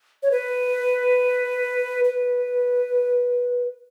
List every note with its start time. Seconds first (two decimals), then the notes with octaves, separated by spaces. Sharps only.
0.23 C#5
0.31 B4
2.04 B4